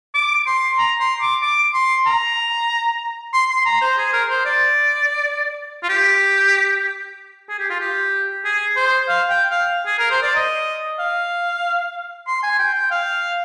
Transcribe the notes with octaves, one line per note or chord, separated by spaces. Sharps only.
D6
C6
A#5
C6
D6
D6
C6
A#5
C6
C6
A#5
C5
G#4
A#4
C5
D5
F4
G4
G#4
G4
F4
G4
G#4
C5
F5
G5
F5
G#4
A#4
C5
D5
D#5
F5
C6
G#5
G5
G5
F5